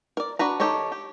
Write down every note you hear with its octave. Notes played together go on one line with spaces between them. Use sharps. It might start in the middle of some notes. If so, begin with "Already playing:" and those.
A#4 D5
D4 F#4 B4 A#5
D#3 G4 A4 C#5 A#5
G4